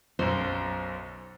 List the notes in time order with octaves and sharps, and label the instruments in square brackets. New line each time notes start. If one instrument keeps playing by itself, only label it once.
[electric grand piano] B1 F#2 [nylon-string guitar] C5